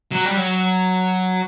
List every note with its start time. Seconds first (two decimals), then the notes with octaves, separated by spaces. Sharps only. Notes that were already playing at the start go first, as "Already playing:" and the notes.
0.12 F#3
0.25 G3
0.37 F#3